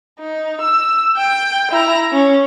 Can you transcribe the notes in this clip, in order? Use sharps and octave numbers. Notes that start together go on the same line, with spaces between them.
D#4
E6
G5
E4 A#5
C#4